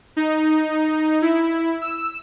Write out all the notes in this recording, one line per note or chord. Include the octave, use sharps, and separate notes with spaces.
D#4
E4
E6